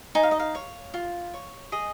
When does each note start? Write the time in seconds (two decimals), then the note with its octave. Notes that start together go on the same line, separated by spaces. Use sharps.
0.15 D#4 G#5
0.23 F5
0.31 D#5
0.39 F5
0.55 C#5
0.94 F4
1.34 C#5
1.72 G#4 D#5